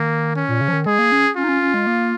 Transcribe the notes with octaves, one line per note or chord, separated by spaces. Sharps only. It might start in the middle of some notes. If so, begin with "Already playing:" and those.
Already playing: D#3 A#3
C#4
A#2
C#3
F3
D#3
G#3 G#4
A#3
C#4
C#4 F4
D#4
C#4
C#4
G#3
A#3